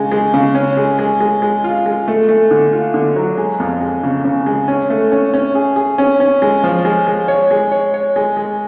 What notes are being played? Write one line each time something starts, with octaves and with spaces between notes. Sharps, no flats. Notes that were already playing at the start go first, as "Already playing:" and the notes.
Already playing: C#3 G#3
G#3
C#3
C#4
G#3
G#3
G#3
G#3
F4
G#3
A3
A3
D3
F4
D3
F#3
G#3
F2
G#3
C#3
C#3
G#3
C#4
A3
C#4
C#4
G#4
G#4
C#4
C#4
G#3
F3
G#3
G#3
C#5
G#3
C#5
C#5
G#3
G#3